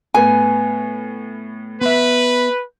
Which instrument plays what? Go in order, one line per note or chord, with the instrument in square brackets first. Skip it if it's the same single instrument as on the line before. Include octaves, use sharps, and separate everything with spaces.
[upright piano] A2 B3 [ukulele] G#5
[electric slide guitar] B3 E5 [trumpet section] B4